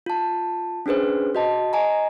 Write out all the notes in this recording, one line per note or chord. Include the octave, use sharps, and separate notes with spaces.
F4 A5
C#4 D4 G#4 B4 C5
F#4 D#5 A5
D#5 G#5 A#5